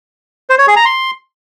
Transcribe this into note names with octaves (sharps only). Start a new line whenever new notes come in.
C5
C#5
G#4
A#5
C6